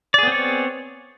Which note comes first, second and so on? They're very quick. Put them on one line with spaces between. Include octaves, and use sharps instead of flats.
D5 G#4 B3 C4 C#5